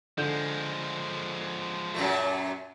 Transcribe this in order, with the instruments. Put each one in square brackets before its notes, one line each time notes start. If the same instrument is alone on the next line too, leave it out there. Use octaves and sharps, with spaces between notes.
[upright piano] D3 G6 [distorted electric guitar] F3 G#3
[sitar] F#2 A#2 A3